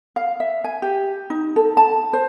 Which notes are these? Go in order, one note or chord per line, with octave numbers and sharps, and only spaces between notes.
F5
E5
G#5
G4
D#4
A4
A5
C5